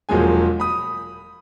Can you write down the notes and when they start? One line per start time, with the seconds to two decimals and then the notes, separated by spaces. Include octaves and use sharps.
0.09 E1 A#2 F3 F#3 G#3 G#5
0.60 B5 D#6